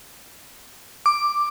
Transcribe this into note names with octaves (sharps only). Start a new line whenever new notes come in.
D6